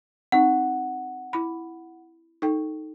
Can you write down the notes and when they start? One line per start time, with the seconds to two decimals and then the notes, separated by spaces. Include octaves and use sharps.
0.32 C4 D#4 F#5
1.33 E4 B5
2.42 D#4 A4 G5